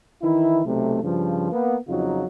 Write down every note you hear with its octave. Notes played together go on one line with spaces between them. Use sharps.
D#3 E3 E4
B1 C3 A3
G2 C#3 F3
A#3 B3
F2 C#3 F#3 D#4 F4